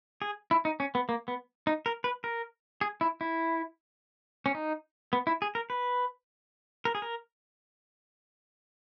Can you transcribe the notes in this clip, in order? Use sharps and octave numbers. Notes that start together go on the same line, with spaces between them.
G#4
E4
D#4
C#4
B3
A#3
B3
D#4
A#4
B4
A#4
G#4
E4
E4
C#4
D#4
B3
E4
G#4
A#4
B4
A#4
G#4
A#4